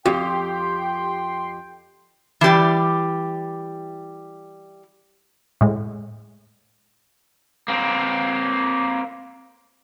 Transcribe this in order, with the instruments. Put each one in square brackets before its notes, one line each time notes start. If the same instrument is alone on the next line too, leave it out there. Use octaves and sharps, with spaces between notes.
[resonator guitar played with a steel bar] F2 [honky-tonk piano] G4 [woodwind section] G5 [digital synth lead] C6
[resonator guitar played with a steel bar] E3 G3 G4 D5
[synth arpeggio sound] A2 G#3
[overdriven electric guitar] A#3 C4